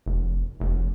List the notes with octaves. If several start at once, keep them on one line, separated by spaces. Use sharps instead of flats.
F1
F1